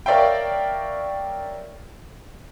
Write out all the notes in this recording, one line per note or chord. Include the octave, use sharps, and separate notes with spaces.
A#4 C#5 D5 E5 F5 G5